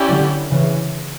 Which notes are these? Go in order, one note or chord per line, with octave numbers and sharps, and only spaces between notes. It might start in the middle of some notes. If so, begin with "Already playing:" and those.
Already playing: C#4 E4 G4 D5
D3 F#3
C#3 E3